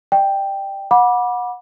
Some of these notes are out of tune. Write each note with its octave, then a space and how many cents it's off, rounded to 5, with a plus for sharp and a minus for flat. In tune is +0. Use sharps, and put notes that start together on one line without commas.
D5 +40 G5 +0
F#5 -30 B5 -30 D6 +0